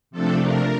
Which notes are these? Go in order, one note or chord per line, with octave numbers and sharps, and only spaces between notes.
C3 F3 A3 D4 A4
A#4